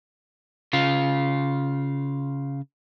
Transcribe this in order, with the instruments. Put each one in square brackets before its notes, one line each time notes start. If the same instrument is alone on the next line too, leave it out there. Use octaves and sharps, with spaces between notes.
[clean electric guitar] C#3 F4